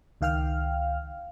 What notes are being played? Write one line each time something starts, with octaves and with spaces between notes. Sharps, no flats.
C#2 D#3 F5 G5 F6